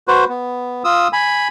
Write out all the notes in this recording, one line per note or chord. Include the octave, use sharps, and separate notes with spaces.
F#4 B4 C5
B3
F4 D#6 E6
G#5 B5